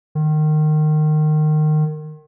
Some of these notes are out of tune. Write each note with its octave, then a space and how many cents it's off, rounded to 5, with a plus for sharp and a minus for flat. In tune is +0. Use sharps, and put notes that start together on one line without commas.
D#3 -25